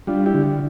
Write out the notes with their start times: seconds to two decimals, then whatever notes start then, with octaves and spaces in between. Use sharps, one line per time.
0.07 G3 D4 F4
0.26 E4 G4
0.34 D3